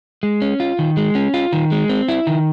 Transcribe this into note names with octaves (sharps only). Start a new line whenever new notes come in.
G#3
C#4
F4
D#3
G#3
C#4
F4
D#3
G#3
C4
E4
D#3